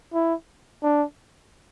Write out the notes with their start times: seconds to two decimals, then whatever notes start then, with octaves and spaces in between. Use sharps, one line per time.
0.13 E4
0.83 D4